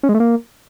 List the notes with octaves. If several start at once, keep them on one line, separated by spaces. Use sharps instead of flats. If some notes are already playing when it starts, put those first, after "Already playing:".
C#4
G#3
A3
A#3